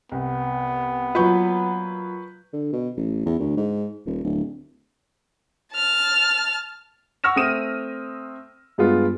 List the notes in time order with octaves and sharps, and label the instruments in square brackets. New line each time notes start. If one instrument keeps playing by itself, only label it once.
[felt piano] C2 [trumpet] B3
[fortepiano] A#2 F#3 [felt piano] B4 C#6 G6
[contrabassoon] D3
B2
A1
E2
D2
G#2
D#1
D1
[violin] A5 F6
[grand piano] F#5 C#6 E6 F6 A#6 E7
A3 C4 D#6 D#7 E7
G2 G#3 B3 F4